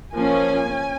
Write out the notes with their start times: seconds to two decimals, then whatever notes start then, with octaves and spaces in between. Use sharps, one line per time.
0.14 F3 A#3 C#4 G#5
0.67 C#4